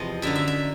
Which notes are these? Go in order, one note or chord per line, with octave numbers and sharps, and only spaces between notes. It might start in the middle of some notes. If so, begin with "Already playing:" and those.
Already playing: E2 C3 F3 D#5
F#2 D3 F#3 E5
E5
E5